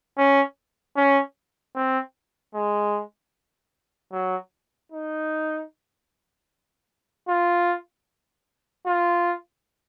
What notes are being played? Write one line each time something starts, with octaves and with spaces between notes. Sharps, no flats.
C#4
C#4
C4
G#3
F#3
D#4
F4
F4